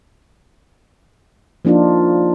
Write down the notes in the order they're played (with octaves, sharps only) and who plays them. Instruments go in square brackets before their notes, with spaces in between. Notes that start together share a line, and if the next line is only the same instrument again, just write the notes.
[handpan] F3 A#3 D4 D#4 F4